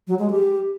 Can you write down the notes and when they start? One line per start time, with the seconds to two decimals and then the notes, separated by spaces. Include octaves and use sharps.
0.08 F#3
0.19 G#3
0.31 G4